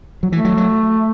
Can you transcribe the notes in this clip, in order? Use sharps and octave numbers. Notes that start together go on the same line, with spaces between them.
F#3
E3 A3
F#3
F#3